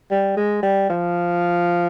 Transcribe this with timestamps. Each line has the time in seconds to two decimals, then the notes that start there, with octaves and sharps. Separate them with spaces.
0.11 G3
0.37 G#3
0.63 G3
0.90 F3